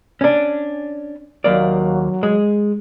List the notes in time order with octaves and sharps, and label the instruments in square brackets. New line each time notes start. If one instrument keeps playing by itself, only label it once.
[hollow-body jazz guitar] C#4 D4
[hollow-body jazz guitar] D#2 A#3 D5 [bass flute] F#3
[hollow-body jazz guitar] G#3